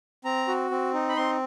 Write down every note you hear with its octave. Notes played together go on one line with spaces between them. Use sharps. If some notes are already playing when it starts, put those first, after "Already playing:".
C4 A#5
F#4
C4
D#4
B5
C4 C6